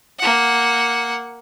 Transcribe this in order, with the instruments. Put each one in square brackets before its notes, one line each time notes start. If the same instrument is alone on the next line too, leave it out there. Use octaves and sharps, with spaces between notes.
[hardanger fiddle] A#3 F#5